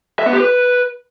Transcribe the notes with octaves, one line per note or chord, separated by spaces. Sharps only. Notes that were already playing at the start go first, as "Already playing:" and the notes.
E5
B3
G4
B4